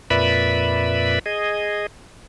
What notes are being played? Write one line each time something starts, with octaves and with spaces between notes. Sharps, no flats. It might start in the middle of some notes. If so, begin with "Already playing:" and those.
F2 A#2 B4 D5 E5 B5
G#4 D#5